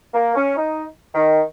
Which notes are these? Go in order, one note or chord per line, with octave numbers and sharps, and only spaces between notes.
A#3
C#4
D#4
D#3